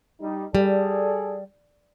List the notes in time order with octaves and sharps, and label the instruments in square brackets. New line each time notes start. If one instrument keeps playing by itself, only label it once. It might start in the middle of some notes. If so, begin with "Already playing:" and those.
[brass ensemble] G3 D#4
[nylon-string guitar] G3 [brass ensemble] G#4 A4 D5